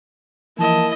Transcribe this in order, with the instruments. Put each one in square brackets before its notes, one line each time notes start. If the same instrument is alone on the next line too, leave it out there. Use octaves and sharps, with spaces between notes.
[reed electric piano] E3 F3 [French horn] A#3 [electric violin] E4 D#5 [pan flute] A5